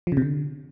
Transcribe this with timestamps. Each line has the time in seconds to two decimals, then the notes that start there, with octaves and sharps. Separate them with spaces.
0.07 F3
0.12 C#3
0.17 C3
0.22 D3